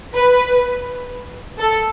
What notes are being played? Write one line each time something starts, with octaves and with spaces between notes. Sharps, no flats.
B4
A4